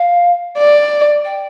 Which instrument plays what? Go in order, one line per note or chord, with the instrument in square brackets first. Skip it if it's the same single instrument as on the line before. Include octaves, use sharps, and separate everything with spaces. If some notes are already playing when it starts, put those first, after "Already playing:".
Already playing: [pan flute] F5
[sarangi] D5
[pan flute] G5